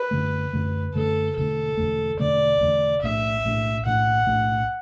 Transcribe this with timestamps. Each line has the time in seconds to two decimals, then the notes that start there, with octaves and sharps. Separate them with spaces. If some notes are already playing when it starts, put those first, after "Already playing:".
Already playing: B4
0.11 F#2 D3 A3
0.53 F#2 D3 A3
0.94 F#2 D3 A3 A4
1.36 E1 E2 D3 A3 A4
1.77 E1 E2 D3 A3
2.19 E1 E2 D3 A3 D5
2.61 E1 E2 D3 A3
3.02 B1 A2 A3 D4 E5
3.44 B1 A2 A3 D4
3.85 B1 A2 A3 D4 F#5
4.27 B1 A2 A3 D4